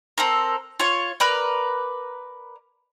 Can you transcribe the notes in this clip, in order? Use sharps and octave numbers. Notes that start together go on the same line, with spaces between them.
C4 A4 A#4
F4 C#5
A#4 B4 D5